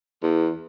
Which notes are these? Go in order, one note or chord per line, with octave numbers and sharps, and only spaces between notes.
E2